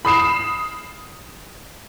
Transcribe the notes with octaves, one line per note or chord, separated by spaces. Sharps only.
B5 D#6 C7 E7